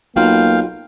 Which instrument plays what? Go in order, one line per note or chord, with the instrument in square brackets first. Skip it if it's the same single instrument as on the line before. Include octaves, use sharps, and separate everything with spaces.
[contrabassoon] B1 [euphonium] A#3 [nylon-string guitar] F4 F#4 [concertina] F5 G5